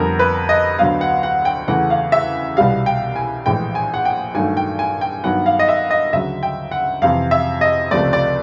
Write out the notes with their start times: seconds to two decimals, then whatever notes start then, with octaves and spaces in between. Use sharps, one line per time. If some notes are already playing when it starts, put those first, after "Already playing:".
Already playing: F2 D3 G3 B3 A#4
0.19 B4
0.49 D#5
0.79 D2 D3 F#3 B3 F5
1.01 F#5
1.23 F#5
1.45 G5
1.68 E2 C#3 E3 A3 F#5
1.90 F5
2.12 E5
2.57 C2 B2 G3 B3 F5
2.86 G5
3.16 G#5
3.46 A#1 A2 E3 G#3 G5
3.75 G#5
3.94 F#5
4.05 G5
4.34 G2 D#3 F#3 A3 G#5
4.57 G5
4.79 G#5
5.01 G5
5.24 G2 D#3 F#3 B3 F#5
5.46 F5
5.59 D#5
5.68 E5
5.91 D#5
6.13 D2 C#3 F#3 E5
6.43 G5
6.71 F#5
7.02 F2 C3 E3 F5
7.31 E5
7.61 D#5
7.91 C#2 C3 F3 A3 D5
8.13 D5